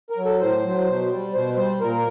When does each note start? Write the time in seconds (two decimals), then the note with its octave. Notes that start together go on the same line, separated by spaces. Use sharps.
0.10 A#4
0.17 F#3
0.25 A4
0.40 A2 C5
0.64 F#3
0.87 B2
1.11 G3
1.34 B2 C5
1.56 G3 C5
1.80 A#2 A#4